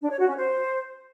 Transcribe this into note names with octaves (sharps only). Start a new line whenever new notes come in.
D4
C#5
F#4
C#4
C5